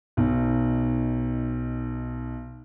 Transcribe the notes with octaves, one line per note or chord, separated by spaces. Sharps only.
B1 D#4